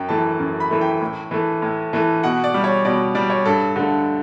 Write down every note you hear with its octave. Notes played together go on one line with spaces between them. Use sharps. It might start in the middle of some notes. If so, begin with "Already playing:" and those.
Already playing: F#2 G5
E3 A3 A5
F#2
B5
E3 A3
G5
A2
E3 A3
A2
E3 A3
B2 F#5
D5
G3
C#5
B2 D5
G3 D5
C#5
G2 A4
D3 A3